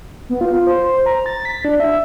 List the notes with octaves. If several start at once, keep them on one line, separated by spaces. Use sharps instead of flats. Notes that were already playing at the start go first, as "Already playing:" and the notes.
B3
F4
C5
C5
A#5
A6
B6
D4
E5